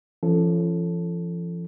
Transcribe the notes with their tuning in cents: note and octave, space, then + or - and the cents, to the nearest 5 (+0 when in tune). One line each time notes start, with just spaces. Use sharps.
F3 -40 C#4 -15 A4 +0